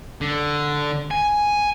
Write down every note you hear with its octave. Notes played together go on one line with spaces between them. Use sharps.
D3
G#5